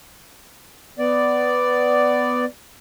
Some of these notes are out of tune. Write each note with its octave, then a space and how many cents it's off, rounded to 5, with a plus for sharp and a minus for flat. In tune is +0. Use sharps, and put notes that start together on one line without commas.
B3 +15 D5 +0